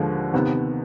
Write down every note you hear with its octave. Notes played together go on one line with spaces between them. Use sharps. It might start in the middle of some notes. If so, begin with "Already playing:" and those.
Already playing: D#2 D3 F3 G#3
C3 D#3 B3